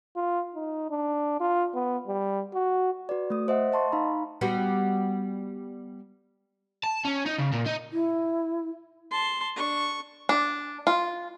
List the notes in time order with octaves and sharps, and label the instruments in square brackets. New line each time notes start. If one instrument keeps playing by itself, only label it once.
[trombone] F4
D#4
D4
F4
B3
G3
F#4
[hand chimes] F#4 B4 D5
A3 D#6
C5 D#5 E5 F#5
D#5 A5 C6 C#6
D#4 F5 A#5 B5
[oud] G3 B3 F#4
[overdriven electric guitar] A5
C#4
D#4
C#3
A#2
D#4
[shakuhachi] E4
[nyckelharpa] A5 C6
D4 C#6
[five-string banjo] D4
F4